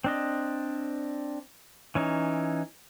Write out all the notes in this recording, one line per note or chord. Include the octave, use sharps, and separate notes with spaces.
C4 D4 D#5
E3 C#4 D#4